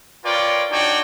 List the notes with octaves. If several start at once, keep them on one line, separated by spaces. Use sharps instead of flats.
F4 A#4 B4 C#5 D5 G5
D4 D#4 F#4 C#5 D5 G5